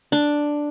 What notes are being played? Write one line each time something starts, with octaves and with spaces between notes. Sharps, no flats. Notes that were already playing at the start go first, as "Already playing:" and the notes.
D4